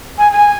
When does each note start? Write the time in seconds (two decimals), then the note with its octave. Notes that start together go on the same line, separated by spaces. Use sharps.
0.18 G#5
0.32 G#5